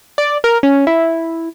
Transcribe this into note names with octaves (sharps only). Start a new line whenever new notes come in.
D5
A#4
C#4
E4